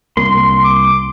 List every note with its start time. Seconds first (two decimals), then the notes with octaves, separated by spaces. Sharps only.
0.17 C2 A#3 C6
0.64 D6